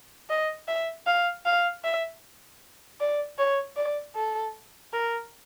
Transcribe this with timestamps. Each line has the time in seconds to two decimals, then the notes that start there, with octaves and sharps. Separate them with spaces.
0.29 D#5
0.68 E5
1.07 F5
1.45 F5
1.84 E5
3.00 D5
3.38 C#5
3.77 D5
4.15 A4
4.93 A#4